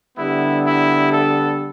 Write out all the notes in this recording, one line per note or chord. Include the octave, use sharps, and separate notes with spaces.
D3 G3 B3 E4
E4
A4